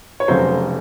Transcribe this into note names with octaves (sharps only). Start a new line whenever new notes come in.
C#5
F1 F2 C#3 F#3 C5